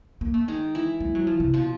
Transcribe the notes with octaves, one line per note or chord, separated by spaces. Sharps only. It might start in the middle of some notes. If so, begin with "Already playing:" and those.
A#3
A3
D#3 G#3 D#4
E3 E4
G#3
F#3
F3
C3
B2 F3 F4